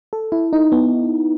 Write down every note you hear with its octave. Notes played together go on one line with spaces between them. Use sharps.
A4
E4
D#4
B3